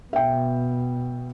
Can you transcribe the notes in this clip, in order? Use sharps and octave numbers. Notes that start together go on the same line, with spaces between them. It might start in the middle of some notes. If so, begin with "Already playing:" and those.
B2 E5 G5